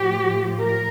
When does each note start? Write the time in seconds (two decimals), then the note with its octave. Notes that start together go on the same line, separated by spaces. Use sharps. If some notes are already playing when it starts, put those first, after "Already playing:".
Already playing: A2 F3 G4
0.59 A#4